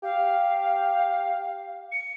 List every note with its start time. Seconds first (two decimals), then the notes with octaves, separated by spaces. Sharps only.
0.03 G4 F5
1.92 C#7